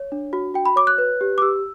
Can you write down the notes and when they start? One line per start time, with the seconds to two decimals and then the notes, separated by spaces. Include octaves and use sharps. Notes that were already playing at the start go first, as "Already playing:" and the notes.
Already playing: C#5
0.12 D4
0.33 F#4
0.54 F#4 G5
0.66 B5
0.76 C#5 D6
0.87 F#6
0.98 B4
1.21 G4
1.38 D6
1.42 G4 E6